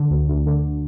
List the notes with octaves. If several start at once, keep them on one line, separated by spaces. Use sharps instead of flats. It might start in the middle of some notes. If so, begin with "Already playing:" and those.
Already playing: D3
D2
D2
D3